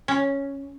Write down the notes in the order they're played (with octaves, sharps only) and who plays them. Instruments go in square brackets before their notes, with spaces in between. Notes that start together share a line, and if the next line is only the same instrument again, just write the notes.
[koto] C#4